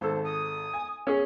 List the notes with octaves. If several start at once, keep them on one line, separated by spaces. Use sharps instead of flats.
G#1 A4 C5
D#6
G#5
C#4 G#4